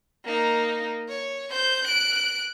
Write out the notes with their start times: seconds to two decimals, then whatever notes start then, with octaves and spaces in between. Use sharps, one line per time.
0.25 A#3 D#4
1.09 C#5
1.51 C5 G6
1.85 F#6 D7